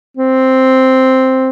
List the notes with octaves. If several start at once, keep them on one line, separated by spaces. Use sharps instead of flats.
C4